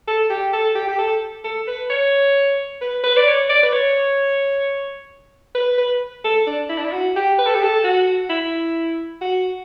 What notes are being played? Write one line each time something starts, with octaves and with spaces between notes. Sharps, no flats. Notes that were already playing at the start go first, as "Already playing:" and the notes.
A4
G4
A4
G4
G4
A4
A4
B4
C#5
B4
B4
D5
C#5
D5
B4
C#5
B4
B4
A4
D4
E4
D4
E4
F#4
G4
B4
A4
G4
A4
F#4
E4
F#4